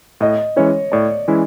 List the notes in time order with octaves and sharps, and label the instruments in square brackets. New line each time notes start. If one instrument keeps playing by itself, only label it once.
[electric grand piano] A2 [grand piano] D#5
[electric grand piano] E3 G#3 C#4 E4 [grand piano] C#5
[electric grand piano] A2 [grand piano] D5
[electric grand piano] E3 G#3 C#4 E4